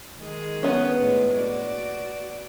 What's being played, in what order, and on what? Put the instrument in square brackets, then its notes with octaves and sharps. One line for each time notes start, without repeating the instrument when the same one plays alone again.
[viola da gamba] D#3 G#3 G#4
[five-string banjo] B3 C#4
[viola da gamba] A2 G#3 D4
F#4 D5